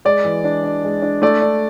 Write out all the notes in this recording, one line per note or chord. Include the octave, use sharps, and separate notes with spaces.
G#3 D5
E3
D4
D4
G#3
D4
A3 D5
D4